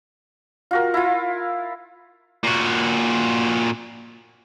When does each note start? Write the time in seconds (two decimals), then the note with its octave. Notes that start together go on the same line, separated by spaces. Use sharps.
0.71 F4 F#4 A#4
0.94 E4 F4
2.44 A#2 F#4